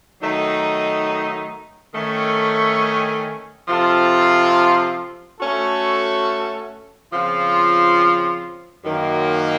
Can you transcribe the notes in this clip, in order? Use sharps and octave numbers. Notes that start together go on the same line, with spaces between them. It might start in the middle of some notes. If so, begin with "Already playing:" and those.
D#3 F#3 A3 D#4
D#3 A3 C#4
C3 F3 C4 F4 A4
A3 C#4 F#4 A4
C#3 F3 C4 F4
F#2 D#3 A#3